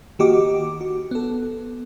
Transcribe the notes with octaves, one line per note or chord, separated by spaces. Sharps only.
D#3 A#3 F#4 G4 D#5 D6
F#4
B3 A4